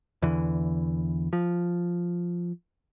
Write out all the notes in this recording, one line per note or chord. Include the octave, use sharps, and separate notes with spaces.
E2 D3 E3
F3